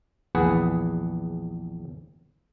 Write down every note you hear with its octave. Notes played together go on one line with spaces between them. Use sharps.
A#1 E2 G#4 B4 F#5